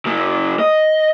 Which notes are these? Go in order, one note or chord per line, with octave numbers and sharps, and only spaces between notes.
C#3 A#3
D#5